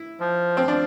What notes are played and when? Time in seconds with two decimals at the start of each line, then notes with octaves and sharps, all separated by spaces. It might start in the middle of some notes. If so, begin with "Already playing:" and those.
Already playing: E4
0.20 F3
0.57 C4
0.67 F3 D4